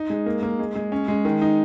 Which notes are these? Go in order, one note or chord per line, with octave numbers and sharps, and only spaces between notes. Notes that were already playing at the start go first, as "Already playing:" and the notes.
Already playing: D#4
G#3
A#3
A#3
G#3
G#3
C#4
G#3
D#3
D#4